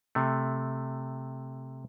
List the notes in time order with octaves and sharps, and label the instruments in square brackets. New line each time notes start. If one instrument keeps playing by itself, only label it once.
[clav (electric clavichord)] C3 A3